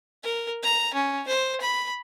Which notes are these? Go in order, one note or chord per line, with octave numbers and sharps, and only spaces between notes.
A#4
A#5
C#4
C5
B5